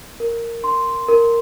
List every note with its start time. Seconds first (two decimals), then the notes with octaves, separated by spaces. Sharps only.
0.20 A#4
0.64 C6
1.08 A#4